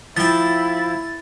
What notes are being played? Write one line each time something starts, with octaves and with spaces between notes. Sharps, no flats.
F3 E4 G5 A6